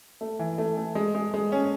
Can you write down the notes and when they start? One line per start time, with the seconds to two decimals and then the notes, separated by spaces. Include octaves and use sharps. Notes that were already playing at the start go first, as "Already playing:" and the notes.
0.21 A3
0.39 E3
0.58 A3
0.77 A3
0.95 G#3
1.15 G#3
1.34 G#3
1.52 C#4